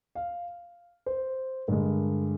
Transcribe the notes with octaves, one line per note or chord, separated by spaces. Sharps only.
F5
C5
G2 D3 G#3 A#4